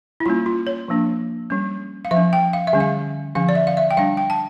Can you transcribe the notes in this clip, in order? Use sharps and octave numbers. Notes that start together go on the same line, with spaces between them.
E4
G3 A#3 C#4 F4
F4
C#5
F3 A#3 D4
G3 C#4
F5
F3 E5
C#4
G5
F5
E5
D3 G3 C#4
F5
D3 F3 C#4 F5
D5
E5
F5
E5
G5
G3 D4 F5
G5
A5